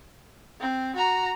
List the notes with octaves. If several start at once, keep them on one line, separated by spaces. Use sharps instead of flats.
C4
F#4 A#5